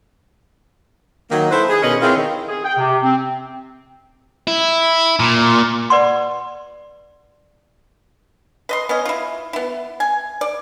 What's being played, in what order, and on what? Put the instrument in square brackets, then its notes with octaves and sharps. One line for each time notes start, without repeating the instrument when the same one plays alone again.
[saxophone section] D#3 F#3 A#3 D#4
E4 A4 B4 C5
G#4
B2 D#3 C#4 B4 D#5
C4 E4 F4 G#4 A#4 C#5
D#3
[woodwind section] G#4
G5
C3
C4
[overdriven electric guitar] E4
A#2
[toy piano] B4 D5 F#5 C6
[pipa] B4 D#5 C6
B3 C#4 D#5
E4 F4
B3 E4
G#5
D5